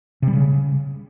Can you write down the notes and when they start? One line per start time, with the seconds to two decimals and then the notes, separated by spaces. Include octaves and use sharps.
0.22 C3
0.28 G3
0.33 C#3